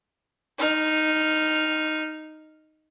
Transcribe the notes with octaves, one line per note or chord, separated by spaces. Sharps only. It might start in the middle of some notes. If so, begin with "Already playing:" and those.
D#4 F6